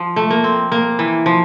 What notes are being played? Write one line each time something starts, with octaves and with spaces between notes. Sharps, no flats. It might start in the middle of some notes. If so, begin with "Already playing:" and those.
Already playing: F3
A3
A#3
C4
A#3
E3
F3